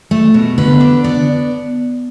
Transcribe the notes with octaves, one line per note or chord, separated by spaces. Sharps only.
A3
B2
D3 B4
D4
B3 D5